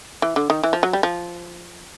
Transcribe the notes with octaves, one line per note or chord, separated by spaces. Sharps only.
E3
D3
D#3
E3
F3
F#3
G3
F3